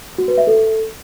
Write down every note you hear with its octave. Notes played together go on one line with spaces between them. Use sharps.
F#4
B4
E5
A4